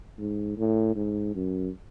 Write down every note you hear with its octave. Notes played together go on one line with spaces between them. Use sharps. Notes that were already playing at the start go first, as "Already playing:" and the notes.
G#2
A2
G#2
F#2